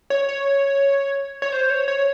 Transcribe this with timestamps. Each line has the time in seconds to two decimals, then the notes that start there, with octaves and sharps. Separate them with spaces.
0.10 C#5
0.29 C#5
1.42 C#5
1.52 C5
1.70 C#5
1.88 C#5